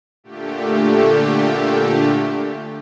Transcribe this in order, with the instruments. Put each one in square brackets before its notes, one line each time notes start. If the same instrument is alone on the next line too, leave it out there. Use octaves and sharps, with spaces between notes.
[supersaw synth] A#2 D3 A3 G4